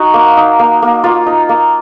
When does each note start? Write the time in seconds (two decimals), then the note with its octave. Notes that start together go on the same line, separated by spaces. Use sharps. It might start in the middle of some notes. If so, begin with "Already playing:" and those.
Already playing: D#4 F#4
0.14 A#3
0.37 D#4
0.59 A#3
0.82 A#3
1.04 A#3 F4
1.27 D#4
1.49 A#3